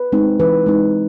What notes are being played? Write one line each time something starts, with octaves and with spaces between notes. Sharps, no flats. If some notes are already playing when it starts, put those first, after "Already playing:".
Already playing: B4
G#3 C4 D#4
E3 B4
G#3 C4 D#4